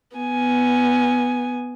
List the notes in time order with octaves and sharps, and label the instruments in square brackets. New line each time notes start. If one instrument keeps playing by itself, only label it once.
[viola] B3 G#5